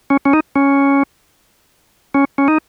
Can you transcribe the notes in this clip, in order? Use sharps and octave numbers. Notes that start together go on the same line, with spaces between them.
C#4
C#4
D#4
C#4
C#4
C#4
D#4